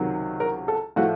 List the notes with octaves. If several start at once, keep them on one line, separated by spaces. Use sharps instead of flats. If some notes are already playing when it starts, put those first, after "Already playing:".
Already playing: C#2 C3 D#3 F#3
A#4
A4
A2 F3 A3 F#4